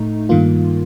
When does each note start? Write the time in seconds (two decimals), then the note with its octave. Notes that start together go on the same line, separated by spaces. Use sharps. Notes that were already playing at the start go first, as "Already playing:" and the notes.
Already playing: A2 A3 D#4
0.29 G2 D#3 A#3 F4